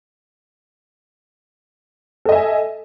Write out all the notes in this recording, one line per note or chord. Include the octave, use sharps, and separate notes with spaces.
A4 D#5 E5 G#5